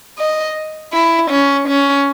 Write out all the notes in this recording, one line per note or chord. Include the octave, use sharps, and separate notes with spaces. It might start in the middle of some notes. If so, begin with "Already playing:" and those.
D#5
E4
C#4
C#4